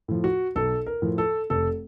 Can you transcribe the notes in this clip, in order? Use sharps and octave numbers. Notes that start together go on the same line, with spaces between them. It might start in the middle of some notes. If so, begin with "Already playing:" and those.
A2 F3
F#4
B1 A4
A#4
A2 F3
A4
F1 A4